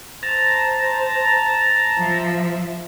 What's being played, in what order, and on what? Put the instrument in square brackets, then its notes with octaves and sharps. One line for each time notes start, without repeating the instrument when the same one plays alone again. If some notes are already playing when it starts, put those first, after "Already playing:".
[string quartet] C5 [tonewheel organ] A5 A#5
[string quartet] F3 E5